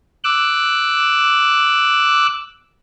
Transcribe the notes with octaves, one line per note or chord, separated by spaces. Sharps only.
D6 E6 F#6